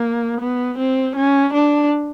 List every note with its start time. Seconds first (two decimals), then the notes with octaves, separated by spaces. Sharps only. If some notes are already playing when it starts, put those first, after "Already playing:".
Already playing: A#3
0.41 B3
0.79 C4
1.16 C#4
1.53 D4